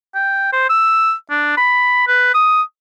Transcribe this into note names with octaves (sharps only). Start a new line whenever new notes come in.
G5
C5
E6
D4
B5
B4
D#6